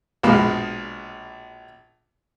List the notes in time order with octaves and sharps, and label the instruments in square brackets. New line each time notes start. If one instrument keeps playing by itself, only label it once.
[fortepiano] A#1 B2 F3 G#3 B5